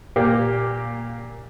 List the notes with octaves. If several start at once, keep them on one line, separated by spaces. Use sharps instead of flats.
A#2 A#3 G4